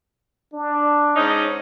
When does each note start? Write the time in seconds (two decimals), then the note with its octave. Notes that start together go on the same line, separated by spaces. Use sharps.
0.53 D4
1.16 G#2 C#4 D#4